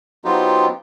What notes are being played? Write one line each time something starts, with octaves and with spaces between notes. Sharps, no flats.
F#3 B3 C4 D#4 F4 G4